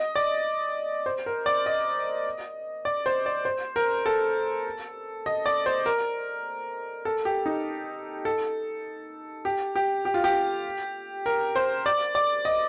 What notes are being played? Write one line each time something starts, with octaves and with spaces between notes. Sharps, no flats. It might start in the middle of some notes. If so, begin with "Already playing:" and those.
Already playing: D#5
D5
C5
A#4
D5
D#5
D5
C5
D5
C5
A#4
A4
D#5
D5
C5
A#4
A4
G4
D#4
A4
G4
G4
G4
F4
G4
A#4
C5
D5
D5
D#5